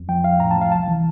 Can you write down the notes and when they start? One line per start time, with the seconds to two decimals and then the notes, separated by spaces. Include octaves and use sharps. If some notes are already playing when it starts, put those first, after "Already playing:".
Already playing: F2
0.08 F3 G5
0.24 F3 F5
0.40 A2 A#5
0.51 A5
0.57 F3 F5
0.72 C2 A5
0.88 E3